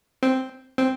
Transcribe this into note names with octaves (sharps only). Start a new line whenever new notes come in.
C4
C4